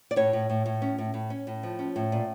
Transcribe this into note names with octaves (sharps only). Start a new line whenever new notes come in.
D5
A2 C#5
A2
A2
A2
C#4
A2
A2
C#4
A2
F3
C#4
A2
A#2